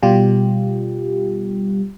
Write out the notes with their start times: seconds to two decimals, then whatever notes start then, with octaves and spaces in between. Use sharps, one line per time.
0.02 B2 G3 F4 G4